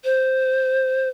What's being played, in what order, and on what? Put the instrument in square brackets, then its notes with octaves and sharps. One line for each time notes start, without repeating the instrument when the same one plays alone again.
[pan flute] C5